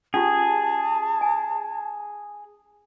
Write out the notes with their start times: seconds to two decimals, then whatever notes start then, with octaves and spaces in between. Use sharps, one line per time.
0.14 C#4 F4 G4 G#4 A5
1.21 G#5